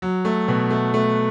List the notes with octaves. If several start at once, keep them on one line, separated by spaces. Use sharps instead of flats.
F#3
A3
B2
A3
A3